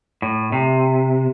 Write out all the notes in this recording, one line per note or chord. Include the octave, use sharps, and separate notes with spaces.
A2
C3